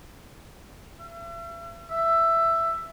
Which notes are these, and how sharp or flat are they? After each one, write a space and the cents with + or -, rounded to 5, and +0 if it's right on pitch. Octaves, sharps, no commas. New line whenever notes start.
E5 +40
E5 +10